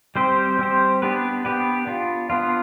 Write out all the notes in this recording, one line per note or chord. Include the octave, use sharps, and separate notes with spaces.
G3 C4 G4 C5
G3 C4 G4 C5
B3 D4 G4 B4
B3 D4 G4 B4
B3 D4 F4
B3 D4 F4